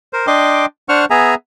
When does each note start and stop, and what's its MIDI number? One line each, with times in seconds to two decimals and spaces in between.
0.13 0.26 70
0.13 0.26 72
0.27 0.66 62
0.27 0.66 75
0.27 0.66 79
0.27 0.66 84
0.27 0.66 86
0.89 1.05 62
0.89 1.05 72
0.89 1.05 78
0.89 1.05 85
0.89 1.05 89
1.10 1.35 59
1.10 1.35 68
1.10 1.35 76
1.10 1.35 80
1.10 1.35 82